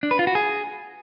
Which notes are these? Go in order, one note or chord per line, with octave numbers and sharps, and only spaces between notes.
D4
B4
F4
F#4
G#4